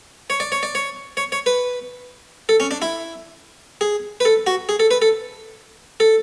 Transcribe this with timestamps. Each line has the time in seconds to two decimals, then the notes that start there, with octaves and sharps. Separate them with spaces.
0.30 C#5
0.40 D5
0.52 C#5
0.63 D5
0.75 C#5
1.17 C#5
1.32 C#5
1.46 B4
2.49 A4
2.60 C#4
2.71 D4
2.82 E4
3.81 G#4
4.20 B4
4.25 A4
4.47 F#4
4.69 G#4
4.80 A4
4.91 B4
5.02 A4
6.00 A4